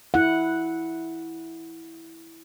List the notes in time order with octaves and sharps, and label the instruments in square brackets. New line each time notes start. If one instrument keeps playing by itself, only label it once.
[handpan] E4 F#5